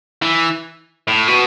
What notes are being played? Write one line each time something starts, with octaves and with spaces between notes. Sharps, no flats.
E3
A2
B2